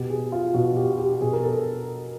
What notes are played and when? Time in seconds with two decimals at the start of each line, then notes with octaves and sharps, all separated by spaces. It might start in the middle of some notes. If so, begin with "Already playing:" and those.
Already playing: B2 G4
0.10 G#4
0.32 F4
0.54 B2 F#4
0.77 G4
0.98 G4
1.21 B2 G#4
1.33 A#4
1.43 A4